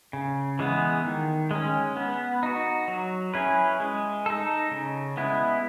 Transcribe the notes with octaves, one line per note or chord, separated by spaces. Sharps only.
C#3
E3 G#3 B3
D#3
G#3 C#4
B3
D#4 F#4
F#3
C#4 E4 G#4 B4
G#3
D#4 A4
C#3
G#3 B3 E4